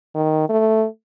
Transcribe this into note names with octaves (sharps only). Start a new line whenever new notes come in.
D#3
A3